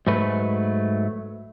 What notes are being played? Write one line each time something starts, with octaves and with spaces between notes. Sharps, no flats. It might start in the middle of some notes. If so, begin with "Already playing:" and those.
G#2 F#3 A3 B4